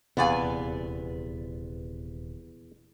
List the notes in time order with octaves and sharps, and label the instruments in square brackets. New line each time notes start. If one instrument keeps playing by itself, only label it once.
[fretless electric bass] D#1 C3 [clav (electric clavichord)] E2 [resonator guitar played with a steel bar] B3 D5 G#5 [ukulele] F5 F#5